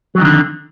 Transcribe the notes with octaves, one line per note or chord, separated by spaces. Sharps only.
F2 D3 D#3 F#3